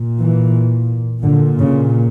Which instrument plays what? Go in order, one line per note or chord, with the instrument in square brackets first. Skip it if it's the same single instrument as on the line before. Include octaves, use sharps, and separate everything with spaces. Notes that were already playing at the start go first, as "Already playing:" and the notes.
Already playing: [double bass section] A#2
E3
A#2 D3
C#3